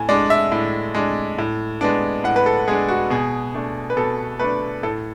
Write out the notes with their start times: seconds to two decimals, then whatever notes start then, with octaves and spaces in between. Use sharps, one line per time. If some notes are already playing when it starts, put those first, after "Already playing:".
Already playing: A2 G#5
0.09 G#3 D4 D5
0.30 E5
0.52 A2
0.95 G#3 D4
1.38 A2
1.81 G#3 B3 D4
2.24 A2 F#5
2.36 B4
2.46 A4
2.68 G#3 B3 D4 G#4
2.88 F#4
3.10 B2 G#4
3.54 A3 D4
3.90 B4
3.97 B2 A4
4.40 A3 D4 B4
4.83 A2 A4